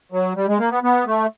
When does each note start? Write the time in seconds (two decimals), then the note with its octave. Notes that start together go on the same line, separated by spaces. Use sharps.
0.12 F#3
0.36 G3
0.48 G#3
0.59 A#3
0.71 B3
0.83 B3
1.06 A3